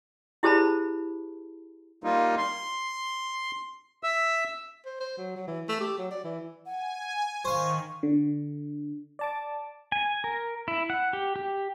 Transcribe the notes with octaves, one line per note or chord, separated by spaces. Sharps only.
E4 G4 G#4 C5 A5 B5
G3 A#3 D#4 F4
C6
E5 E6
C5
C5
F#3
F#3
E3
A3
G4
F#3
D5
E3
F#5 G#5
D#3 C5 F5 C#6
D3
D5 A5 D6
G#5
A#4
E4
F#5
G4
G4